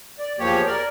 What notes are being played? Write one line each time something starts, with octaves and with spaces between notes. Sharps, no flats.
D5
E2 F3 A#3 G4 C#5
A#4 D5